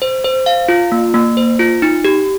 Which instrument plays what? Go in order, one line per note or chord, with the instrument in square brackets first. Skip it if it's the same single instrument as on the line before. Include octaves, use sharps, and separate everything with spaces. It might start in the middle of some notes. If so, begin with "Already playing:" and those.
[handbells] C5
C5
F5
F4
A#3
A#3
C5
F4
D#4
G4